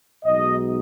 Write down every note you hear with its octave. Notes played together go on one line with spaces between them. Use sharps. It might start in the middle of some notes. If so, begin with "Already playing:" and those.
B1 B2 G#3 D#4 D#5